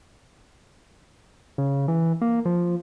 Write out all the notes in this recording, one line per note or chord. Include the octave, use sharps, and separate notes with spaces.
C#3
E3
A#3
F3